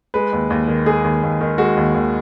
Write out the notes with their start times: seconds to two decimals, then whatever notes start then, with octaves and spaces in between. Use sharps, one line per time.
0.14 G#3 B4
0.33 D#2
0.50 D#2
0.68 D#3
0.86 G#3 G#4
1.04 D#2
1.23 D#2
1.41 D#3
1.58 G#3 F#4
1.77 D#2
1.94 D#2